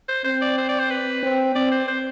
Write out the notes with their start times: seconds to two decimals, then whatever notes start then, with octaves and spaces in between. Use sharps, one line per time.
0.09 C5
0.24 C4 C5
0.42 D5
0.58 C5
0.69 D5
0.80 C5
0.90 B4
1.23 C4
1.55 C4 D5
1.72 C5
1.88 C5